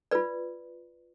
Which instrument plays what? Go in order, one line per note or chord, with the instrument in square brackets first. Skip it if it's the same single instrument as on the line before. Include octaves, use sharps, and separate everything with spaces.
[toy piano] F4 B4 D5